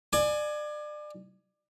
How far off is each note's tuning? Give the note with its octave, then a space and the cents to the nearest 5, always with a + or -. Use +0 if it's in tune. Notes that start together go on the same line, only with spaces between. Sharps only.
D5 +30 G#5 +15